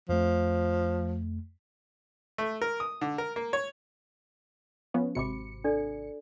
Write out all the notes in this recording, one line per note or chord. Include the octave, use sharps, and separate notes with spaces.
F2 F3 A3
A3
A#4
D#6
D3
A#4
A#3
C#5
F3 B3 C#4
G#1 C3 F#4 B5 D6 C#7
D4 A4 D5